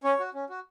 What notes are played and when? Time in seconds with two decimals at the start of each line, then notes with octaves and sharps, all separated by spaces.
0.04 C#4 C#5
0.20 F#4
0.34 C#4
0.49 F#4